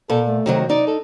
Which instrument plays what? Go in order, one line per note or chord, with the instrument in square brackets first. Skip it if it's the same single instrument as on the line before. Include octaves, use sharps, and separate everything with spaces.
[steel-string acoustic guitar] A#2 [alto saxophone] A4
[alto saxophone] A3
[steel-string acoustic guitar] C3 D#3 F#3
[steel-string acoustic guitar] D#4 [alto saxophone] D5
[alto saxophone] A4